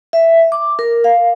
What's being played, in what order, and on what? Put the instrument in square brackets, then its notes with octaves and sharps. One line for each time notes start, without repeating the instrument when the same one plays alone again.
[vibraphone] E5
D6
A#4
F5